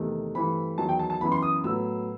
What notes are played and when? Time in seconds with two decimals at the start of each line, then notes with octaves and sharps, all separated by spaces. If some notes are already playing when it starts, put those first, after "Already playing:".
Already playing: E2 C3 D#3 A3
0.35 G2 E3 A3 C4 B5
0.78 E2 D#3 F#3 A5
0.89 G5
0.99 A5
1.10 A5
1.21 F#2 E3 B3 B5
1.32 C6
1.42 D#6
1.64 A2 F#3 B3 E6